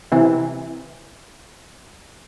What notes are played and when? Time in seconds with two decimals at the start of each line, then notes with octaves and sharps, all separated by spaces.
0.12 C3 E3